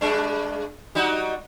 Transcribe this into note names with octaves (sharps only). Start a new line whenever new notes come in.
G2 G#3 D4
G3 D#4 F#4